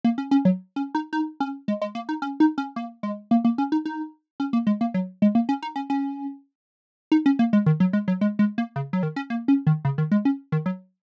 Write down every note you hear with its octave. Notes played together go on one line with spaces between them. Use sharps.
A#3
C#4
C#4
F#3
C#4
D#4
D#4
C#4
G#3
G#3
A#3
D#4
C#4
D#4
C#4
A#3
G#3
A#3
A#3
C#4
D#4
D#4
C#4
A#3
G#3
A#3
F#3
G#3
A#3
C#4
D#4
C#4
C#4
D#4
C#4
A#3
G#3
D#3
F#3
G#3
F#3
G#3
G#3
A#3
C#3
F#3
D#3
C#4
A#3
C#4
D#3
C#3
D#3
G#3
C#4
D#3
F#3